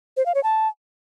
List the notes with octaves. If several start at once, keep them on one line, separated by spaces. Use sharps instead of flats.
C5
F5
C#5
A5